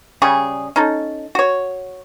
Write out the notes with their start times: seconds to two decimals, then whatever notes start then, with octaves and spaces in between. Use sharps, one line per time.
0.22 C#3 G3 G#4 C#6
0.76 C#4 D#4 A4
1.35 F#4 C#5